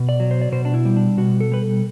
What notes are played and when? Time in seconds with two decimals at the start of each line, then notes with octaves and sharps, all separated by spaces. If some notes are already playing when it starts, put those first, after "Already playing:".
Already playing: B2
0.09 D5
0.20 F#3
0.31 C5
0.42 D5
0.52 B2 C5
0.65 D4
0.74 E4
0.85 G3
0.97 D4
1.17 B2 F#4
1.40 A4
1.52 G3 B4
1.62 A4